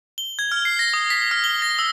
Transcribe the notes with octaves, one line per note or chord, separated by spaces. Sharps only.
G7
G#6
F6
C7
A#6
D#6
B6
F6
G7
A#6
E6